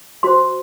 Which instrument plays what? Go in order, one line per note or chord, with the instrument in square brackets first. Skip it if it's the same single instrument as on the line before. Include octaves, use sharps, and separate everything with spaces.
[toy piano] F#4 C5 C6